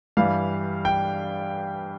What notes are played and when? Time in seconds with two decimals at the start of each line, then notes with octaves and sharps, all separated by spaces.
0.17 G2 E3 G3 F5
0.85 G5